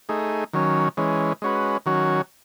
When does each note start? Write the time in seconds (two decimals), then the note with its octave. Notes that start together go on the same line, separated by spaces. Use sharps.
0.09 A3 D#4 G#4
0.53 D#3 F#3 C#4
0.97 E3 G#3 C#4
1.42 G#3 C#4 F#4 B4
1.86 D#3 F#3 C#4 F#4